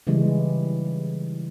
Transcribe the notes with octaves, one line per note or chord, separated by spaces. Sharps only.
C#3 E3 G3 G#3